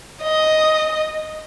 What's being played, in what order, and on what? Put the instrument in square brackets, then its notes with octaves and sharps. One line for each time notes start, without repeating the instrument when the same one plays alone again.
[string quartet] D#5